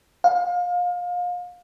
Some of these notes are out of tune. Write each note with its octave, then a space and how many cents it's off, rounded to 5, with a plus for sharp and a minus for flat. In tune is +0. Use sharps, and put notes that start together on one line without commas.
F5 +30